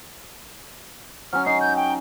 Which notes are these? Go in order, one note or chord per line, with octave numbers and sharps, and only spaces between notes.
F#3 C#4 F6
D#4 C7
G6
G5